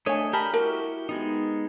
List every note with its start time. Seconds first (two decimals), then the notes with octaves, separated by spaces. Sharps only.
0.06 A3 D4 C#5 D#5 G#5
0.33 G4 A#4 A5 B5
0.54 E4 F#4 G4 A#4
1.09 G#3 B3 D#4